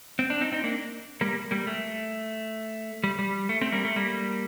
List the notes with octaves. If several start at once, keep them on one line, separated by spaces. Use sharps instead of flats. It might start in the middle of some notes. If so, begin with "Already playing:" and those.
C4
D4
C4 D#4
C4 D#4
A#3 D4
G3 A#3
G3 A#3
A3
G3
G3
A3
A3 C4
G3 A#3
A3
G3 A#3